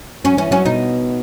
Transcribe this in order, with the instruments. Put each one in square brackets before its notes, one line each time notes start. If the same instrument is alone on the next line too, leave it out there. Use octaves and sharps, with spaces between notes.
[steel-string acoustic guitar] F#3 [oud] C#4
[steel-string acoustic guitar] E3 [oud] C#4
[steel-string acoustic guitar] F#3 [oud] C#4
[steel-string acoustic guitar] B2 [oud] D#4